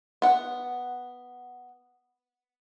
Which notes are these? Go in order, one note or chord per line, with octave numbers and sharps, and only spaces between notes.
B3 F#5